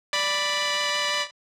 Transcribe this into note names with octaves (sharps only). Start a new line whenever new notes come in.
D5 B5